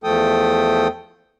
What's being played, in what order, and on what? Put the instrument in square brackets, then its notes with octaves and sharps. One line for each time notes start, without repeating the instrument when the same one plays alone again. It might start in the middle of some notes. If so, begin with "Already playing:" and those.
[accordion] E2 F3 A3 A4 G5 D#6